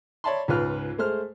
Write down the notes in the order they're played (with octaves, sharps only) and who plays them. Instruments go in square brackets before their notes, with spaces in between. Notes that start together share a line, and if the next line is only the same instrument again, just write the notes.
[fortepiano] C#5 D5 E5 A5 B5 C6
C#2 G#2 F4 B4 F6
G#3 A3 C5 F6